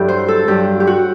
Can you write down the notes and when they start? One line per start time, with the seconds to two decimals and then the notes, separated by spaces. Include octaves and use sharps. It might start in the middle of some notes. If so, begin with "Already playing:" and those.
Already playing: G2 F#3 E4 G4 A4
0.08 C5
0.28 A4
0.48 G2 F#3 G4
0.80 G4
0.87 F#4